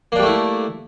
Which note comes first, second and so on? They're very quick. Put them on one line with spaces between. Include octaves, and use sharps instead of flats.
A#3 D4 G3 A3 E4